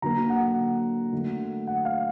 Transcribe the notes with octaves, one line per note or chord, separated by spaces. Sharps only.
D3 F#3 A#3 A#5
F#5
D3 F#3 A3
F#5
F5